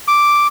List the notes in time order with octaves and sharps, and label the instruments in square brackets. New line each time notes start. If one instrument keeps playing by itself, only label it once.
[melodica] D6